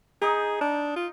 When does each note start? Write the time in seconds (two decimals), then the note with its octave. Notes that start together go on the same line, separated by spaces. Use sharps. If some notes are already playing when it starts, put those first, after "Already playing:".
0.22 D#4 G#4
0.61 D4
0.96 F4